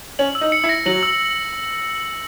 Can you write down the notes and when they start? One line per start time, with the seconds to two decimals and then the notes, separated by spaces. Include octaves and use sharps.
0.19 C#4 F#7
0.35 E6
0.41 D#4
0.52 C#7
0.64 E4
0.69 A#6
0.86 F#3 F#7
1.03 E6